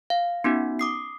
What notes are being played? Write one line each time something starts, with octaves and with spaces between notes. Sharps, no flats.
F5
B3 C#4 D#4 F#4
D6 D#6 C7